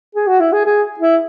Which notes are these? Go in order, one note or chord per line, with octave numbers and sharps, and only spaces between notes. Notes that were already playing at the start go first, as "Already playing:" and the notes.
G#4
F#4
E4
G#4
G#4
E4